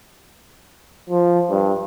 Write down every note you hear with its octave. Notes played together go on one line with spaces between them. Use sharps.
F3
G2